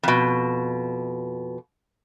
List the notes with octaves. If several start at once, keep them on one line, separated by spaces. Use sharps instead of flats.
F2 B2